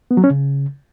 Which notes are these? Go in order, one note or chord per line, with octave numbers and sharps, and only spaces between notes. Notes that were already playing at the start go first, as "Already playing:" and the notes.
B3
F#3
C#4
C#3